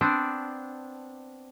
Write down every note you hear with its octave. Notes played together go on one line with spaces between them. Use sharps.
B3 C4 D4